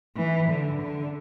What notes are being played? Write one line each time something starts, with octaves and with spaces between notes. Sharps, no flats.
E3
D3
D3